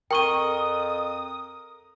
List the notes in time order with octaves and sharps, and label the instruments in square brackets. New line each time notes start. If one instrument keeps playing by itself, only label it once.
[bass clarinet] F2 [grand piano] A#4 G7 [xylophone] G5 C#6 D#7 [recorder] D#6